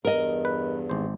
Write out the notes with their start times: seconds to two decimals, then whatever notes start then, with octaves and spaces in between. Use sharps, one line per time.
0.05 E2 G2 A#4 D#5
0.45 B4
0.90 G#1 C5